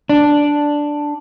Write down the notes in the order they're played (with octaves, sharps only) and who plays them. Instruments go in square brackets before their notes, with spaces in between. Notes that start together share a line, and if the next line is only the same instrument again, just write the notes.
[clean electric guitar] D4